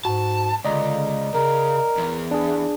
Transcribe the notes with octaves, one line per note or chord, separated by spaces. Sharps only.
G#2 F#4 A5
C#2 D3 D5 D#5 A#5
C#3 A#4
E2
D4 G#4